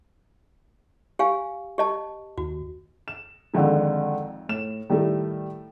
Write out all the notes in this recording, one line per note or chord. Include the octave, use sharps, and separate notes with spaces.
G4 F5 G#5
G4 D#5 A5
D#2 F#4
E7
G#1 F2 G#2 D3 D#3 G#3
A2 E7
A2 D#3 G3 A3